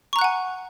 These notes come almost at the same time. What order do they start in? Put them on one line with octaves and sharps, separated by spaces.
C#6 A#5 F#6 F#5 G#5